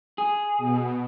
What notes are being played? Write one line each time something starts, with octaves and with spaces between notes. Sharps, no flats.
G#4
B2